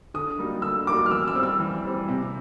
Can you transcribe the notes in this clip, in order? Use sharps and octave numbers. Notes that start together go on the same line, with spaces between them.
D3 D#6
G3 A#3 D#4 F#4
D3 E6
G3 A#3 D#4 F#4 D6
F6
E3 E6
E6
G3 C4
E6
E3
G3 C4
C3